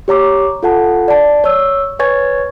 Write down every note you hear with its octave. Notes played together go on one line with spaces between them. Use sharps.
G4 C#5 A#5 D6
F4 A4 F#5 A5
D5 A5
C#5 E6
B4 C#5 G#5 C#6 G#6 A6